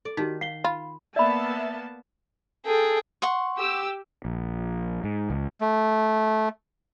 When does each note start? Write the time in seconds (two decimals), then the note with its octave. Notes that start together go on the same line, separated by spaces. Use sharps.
0.05 A4 D5
0.17 D#3 D#4 F#4 G4 B6
0.41 F5 C7 G7
0.64 F4 B5
1.16 A#3 B3 D5 E5 A5 B5
2.66 G#4 A4 G5
3.22 F#5 C6 C#6
3.58 G4 E6
4.25 A#1
5.04 G#2
5.30 C#2
5.61 A3